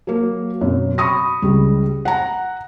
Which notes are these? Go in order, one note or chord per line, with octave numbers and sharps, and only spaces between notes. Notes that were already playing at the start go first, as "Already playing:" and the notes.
F#3 A#3
F#2 B2
B5 C#6 D#6 A#6
C#2 G3
F#5 A#5